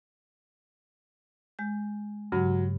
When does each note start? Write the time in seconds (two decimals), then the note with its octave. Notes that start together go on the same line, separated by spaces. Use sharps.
1.59 G#3 G6
2.32 G2 C#3 F#3